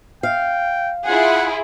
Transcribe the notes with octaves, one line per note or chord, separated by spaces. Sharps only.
F5 G5
E4 F4 G#4 F#5